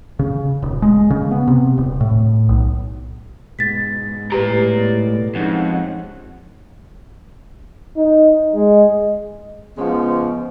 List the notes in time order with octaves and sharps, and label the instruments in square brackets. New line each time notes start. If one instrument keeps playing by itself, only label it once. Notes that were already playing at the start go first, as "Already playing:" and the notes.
[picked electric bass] C#3
D#1
G#3
C#3
B3
C3
D#1
A2
B1
[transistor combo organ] G#2 B2 [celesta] A6 B6
[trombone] A2 [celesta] G4 B4 [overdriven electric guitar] D5 A#5
[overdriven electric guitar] F2 [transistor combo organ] G#3 C#4 F#5 [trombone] D#4
[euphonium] D#4
G#3
[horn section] C#3 F3 G#3 B3